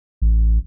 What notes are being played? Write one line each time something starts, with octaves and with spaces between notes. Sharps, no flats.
A1